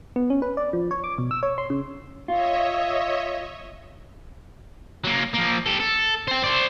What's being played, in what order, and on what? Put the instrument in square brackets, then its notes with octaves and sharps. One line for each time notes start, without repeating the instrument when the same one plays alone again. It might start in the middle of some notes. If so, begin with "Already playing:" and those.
[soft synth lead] B3
C#4
B4
D5
F3
C#5
D6
B2
E6
C#5
C6
C#3
[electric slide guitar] F4 [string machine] C#5 D#5 E5
[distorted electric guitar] F#3 A#3
F3 A#3
G4 A4
A4
C5 G5
C5 D5